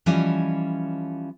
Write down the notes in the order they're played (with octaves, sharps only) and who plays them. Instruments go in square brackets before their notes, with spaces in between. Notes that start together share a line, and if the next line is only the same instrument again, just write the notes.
[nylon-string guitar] E3 F3 G3 C#4 D5 D#5